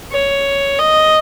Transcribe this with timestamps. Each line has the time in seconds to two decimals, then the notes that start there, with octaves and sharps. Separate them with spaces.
0.12 C#5
0.79 D#5